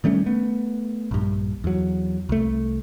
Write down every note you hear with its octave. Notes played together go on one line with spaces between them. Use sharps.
D#3 G3 A3 C#4
A3 B3
A#1 G2
E2 F#3
C2 A3